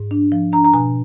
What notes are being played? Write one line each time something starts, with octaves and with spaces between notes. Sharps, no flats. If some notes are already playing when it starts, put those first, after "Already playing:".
Already playing: G#2
D4
F3
D4 A#5
A#5
B2 G#5